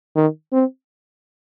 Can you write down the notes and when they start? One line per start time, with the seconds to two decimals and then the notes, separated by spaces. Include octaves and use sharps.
0.15 D#3
0.52 C4